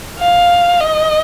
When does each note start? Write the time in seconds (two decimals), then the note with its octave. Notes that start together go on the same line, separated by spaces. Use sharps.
0.18 F5
0.80 D#5